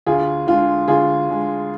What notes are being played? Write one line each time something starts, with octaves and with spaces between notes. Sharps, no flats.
D2 F4 G#4
D3 G#3 F4
D2 F4 G#4
D3 G#3